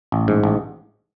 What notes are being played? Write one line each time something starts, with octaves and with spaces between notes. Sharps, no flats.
A1
G#2
A1